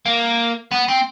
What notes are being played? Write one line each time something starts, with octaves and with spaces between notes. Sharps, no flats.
A#3
B3
C4